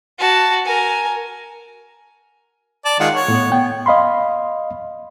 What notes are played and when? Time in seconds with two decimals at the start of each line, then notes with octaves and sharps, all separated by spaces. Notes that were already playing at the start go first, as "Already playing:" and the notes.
0.19 F#4 A5
0.65 A#4 G#5
2.85 D5 A5
3.00 D#3 G#3 F4 F#5
3.14 C#5
3.28 A2 B3
3.52 B3 G5
3.86 D#5 F5 B5 C6